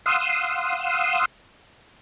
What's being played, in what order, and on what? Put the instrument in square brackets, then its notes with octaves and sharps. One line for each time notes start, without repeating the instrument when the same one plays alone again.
[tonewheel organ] F5 F#5 C6 D#6 E6